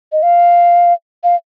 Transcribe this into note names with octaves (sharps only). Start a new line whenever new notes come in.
D#5
F5
F5